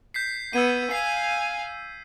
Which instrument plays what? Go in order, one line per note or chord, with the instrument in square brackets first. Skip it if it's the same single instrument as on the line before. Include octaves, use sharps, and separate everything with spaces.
[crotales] G6 B6 C7
[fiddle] B3 [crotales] E6 G#6 D#7
[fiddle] F5 G#5 [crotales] C7